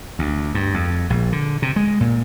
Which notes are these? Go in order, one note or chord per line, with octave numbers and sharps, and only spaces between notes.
D2
G2
F2
A#1
D3
C3
G#3
A#2